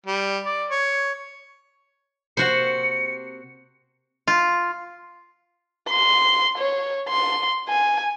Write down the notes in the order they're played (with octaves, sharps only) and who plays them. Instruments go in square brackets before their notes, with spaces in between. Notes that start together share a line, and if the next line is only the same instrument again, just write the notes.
[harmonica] G3
D5
C#5
[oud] C3 A#3 [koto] F#4 C5 [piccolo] C#7
[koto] F4
[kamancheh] C6
C#5
C6
G#5